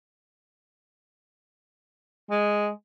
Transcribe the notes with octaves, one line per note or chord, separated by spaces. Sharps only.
G#3